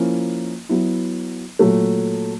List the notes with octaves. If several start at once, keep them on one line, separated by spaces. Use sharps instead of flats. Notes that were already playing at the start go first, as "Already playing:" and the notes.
Already playing: F3 A#3 C#4 E4
F#3 B3 E4
A#2 F#3 A3